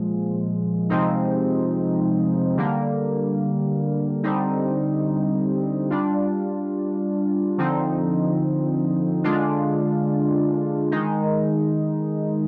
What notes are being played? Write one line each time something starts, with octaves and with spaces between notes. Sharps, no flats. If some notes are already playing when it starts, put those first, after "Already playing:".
Already playing: A#2 F3 G#3
C3 F3 G#3 C4 D#4
D3 G3 A#3
D3 G3 C4 D#4
G3 D4 F4
D3 F3 C4 D#4
D3 G#3 D4 F4
D#3 G#3 D#4